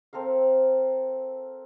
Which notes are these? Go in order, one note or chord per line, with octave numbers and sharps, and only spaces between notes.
C4 A4 A#4 F5